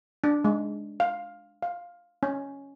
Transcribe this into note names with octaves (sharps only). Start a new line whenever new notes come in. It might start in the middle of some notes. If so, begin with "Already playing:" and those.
D4
G#3
F5
F5
C#4